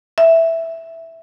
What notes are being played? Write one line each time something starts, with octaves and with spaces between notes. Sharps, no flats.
E5